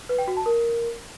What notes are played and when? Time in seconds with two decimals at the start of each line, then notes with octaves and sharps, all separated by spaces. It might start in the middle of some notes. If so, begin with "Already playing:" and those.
0.09 B4
0.18 G5
0.28 F#4
0.37 A5
0.46 A#4